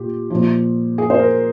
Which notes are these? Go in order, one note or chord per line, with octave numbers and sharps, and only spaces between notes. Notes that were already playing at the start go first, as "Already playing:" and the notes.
Already playing: A#2 G4
A#2 F3
G#4
C5
A#4